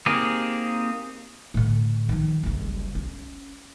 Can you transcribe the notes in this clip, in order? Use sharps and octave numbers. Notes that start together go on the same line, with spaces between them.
A#3 C4 D#4 G4 G#4
A2 D3
D#3 F3
F#1 C2
C#4